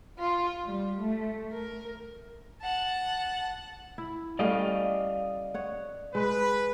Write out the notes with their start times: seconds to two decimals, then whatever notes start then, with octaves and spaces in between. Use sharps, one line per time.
0.18 F4
0.66 G3
1.00 A3
1.52 A#4
2.62 F#5 A5
3.98 E4
4.39 G3 A3 C#4 D5 D#5 F5
5.54 C#5 F#5
6.15 G#3 B4